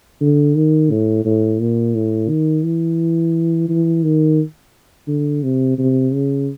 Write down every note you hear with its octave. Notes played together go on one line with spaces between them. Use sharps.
D3
D#3
A2
A2
A#2
A2
D#3
E3
E3
D#3
D3
C3
C3
C#3